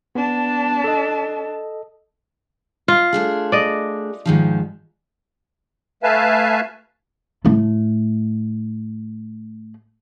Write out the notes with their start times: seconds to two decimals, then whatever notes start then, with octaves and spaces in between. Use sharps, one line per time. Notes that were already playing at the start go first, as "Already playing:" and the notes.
0.15 B3 D4 A5
0.84 A4 D#5
2.88 F4 D#5
3.13 A3 D4 G#4
3.52 D5 D#5
4.25 G#2 D#3 F3
6.03 A3 B4 E5 F5 G#5 A5
7.45 A2 A3